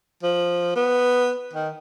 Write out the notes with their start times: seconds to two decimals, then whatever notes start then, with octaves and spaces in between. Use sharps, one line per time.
0.23 F3
0.76 B3
1.53 D#3